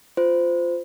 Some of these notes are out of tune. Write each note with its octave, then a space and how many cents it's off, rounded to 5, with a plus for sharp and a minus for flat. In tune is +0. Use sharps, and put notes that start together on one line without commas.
F4 +0 C5 -20